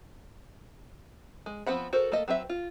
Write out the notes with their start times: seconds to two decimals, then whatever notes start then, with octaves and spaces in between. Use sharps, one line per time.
1.46 G#3
1.66 F3 B3 C4 F#5 B5
1.93 F#4 A4 A#4 C5
2.12 A3 A#3 A4 D#5
2.28 F#3 C4 B4 E5
2.49 F4